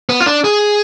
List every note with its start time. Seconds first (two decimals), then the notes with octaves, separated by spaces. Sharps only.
0.09 B3
0.21 F4
0.27 D4
0.44 G#4